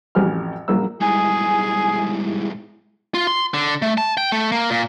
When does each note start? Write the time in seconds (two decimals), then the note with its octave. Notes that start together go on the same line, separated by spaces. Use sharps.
0.15 A1 F2 F#4 G4 G#5 F6
0.68 A#1 F#2 A#3 E6
1.01 B1 G#2 G3 G#3 E4 G#4 G#5
3.14 F4
3.27 C6
3.54 D3
3.82 A3
3.98 A5
4.17 G5
4.32 A3
4.52 A#3
4.70 A#2